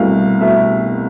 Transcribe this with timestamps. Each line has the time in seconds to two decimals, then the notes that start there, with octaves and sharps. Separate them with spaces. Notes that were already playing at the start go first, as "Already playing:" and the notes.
Already playing: C2 B2 A3 F5
0.40 B2 A3 E5